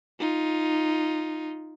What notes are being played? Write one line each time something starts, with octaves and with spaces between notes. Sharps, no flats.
D#4 F4